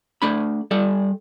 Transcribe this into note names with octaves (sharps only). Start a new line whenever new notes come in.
A3 D4 B5
G3 A4 D5